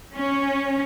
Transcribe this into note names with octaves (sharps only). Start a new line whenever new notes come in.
C#4